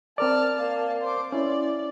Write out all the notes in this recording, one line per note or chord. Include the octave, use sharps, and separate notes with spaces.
C4 A#4 D5 A5 F6
A#3 A5
C5 D6
C#4 E4 D5